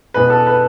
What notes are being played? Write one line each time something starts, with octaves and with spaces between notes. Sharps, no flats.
E2 B2 B4
A4
B4